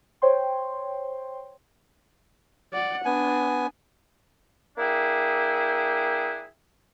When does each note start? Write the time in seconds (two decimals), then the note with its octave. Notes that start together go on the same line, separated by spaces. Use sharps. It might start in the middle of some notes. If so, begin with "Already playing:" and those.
0.22 C5 C#5 G5 C6
2.73 D5 F#5
3.05 B3 D4 G#5
4.78 A#3 D4 E4 G#4 G5